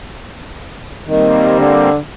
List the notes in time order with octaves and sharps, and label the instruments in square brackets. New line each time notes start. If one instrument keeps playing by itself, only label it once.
[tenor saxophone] D#3 [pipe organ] G3 A#3 C4
[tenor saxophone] D3